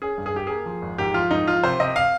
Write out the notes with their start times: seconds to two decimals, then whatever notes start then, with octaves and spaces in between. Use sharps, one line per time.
0.02 C#4 G#4
0.18 G2
0.26 G#4
0.34 G2 G4
0.47 A#3 G#4
0.66 F3
0.82 G#1
0.98 G#2 G4
1.14 F3 F4
1.31 G#2 D#4
1.47 F3 F4
1.63 C3 C5
1.80 C3 D#5
1.96 F5